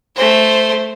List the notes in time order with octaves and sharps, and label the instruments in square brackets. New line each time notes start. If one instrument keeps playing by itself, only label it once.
[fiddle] A3 C5